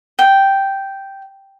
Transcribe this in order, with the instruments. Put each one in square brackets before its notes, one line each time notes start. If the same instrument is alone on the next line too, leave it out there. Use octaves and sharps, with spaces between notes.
[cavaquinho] G5